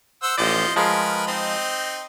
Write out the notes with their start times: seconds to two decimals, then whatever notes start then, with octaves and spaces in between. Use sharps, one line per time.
0.23 C5 F#5 E6
0.38 A1 F3 C5 D5 D#5
0.76 F3 G#3 A#4 B4
1.27 C4 D#4